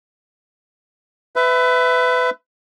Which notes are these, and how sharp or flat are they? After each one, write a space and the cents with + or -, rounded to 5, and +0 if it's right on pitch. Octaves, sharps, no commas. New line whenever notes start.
B4 +25 E5 +0